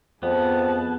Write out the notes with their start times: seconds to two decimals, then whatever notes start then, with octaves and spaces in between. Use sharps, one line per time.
0.23 F2 B3 G#4 A5